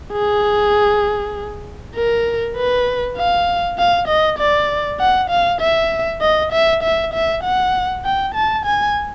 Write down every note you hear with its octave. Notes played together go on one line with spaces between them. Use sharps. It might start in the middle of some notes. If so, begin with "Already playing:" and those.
G#4
A#4
B4
F5
F5
D#5
D5
F#5
F5
E5
D#5
E5
E5
E5
F#5
G5
A5
G#5